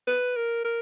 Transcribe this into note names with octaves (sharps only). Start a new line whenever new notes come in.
B4
A#4
A#4